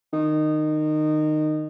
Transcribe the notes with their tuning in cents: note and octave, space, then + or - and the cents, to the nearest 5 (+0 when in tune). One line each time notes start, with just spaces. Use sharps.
D#3 -20